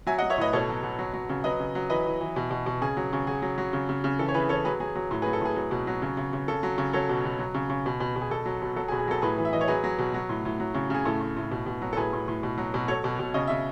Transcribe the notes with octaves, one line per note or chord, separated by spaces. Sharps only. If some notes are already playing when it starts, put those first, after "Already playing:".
F#3 E5 G#5
D#5 F#5
F#3
C#5 E5
A2 B4 D#5
B2 A4 C#5
F#3
B2
F#3
F#3
C#3
F#3 B4 D#5
C#3
F#3
E3 B4 D#5
E3
E3
B2
B2
B2
C#3 G#4
F#3
C#3
F#3 G#4
F#3
F#3
C#3
C#3
C#3
E3 A4
C#5
E3 G#4 B4
E3 A4 C#5
F#3 G#4 B4
F#3 G#4
F#3
A2
G#4 B4
F#3
A4
A2 G#4 B4
F#3
B2
F#3
C#3
C#3
C#3
C#3 A4
F#3
C#3
F#3 A4 C#5
B2
B2
F#3
C#3
C#3
B2
B2
B2
G#4
B2 A4
F#3
B2
F#3 A4
G#4
B2
G#4
F#3 A4
A2 G#4 B4
E3
E5
E3 D#5
C#5
F#3 G#4 B4
F#3
B2
F#3
A2
A2
F#3
C#3
C#3 G#4
A2 A4
A2
A2
B2
B2
F#3
A4
A2 G#4 B4
A2
A2
B2
F#3
B2
F#3 A4 C#5
B2
B2
C#3 D#5
C#3 E5